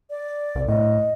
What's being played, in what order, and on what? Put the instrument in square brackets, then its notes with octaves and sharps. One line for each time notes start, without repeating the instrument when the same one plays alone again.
[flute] D5
[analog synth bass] C2
[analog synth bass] A2 [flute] D#5